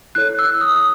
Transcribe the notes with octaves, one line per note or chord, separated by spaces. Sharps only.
E4 A4 C#5 F#6
E6
D#6
D#6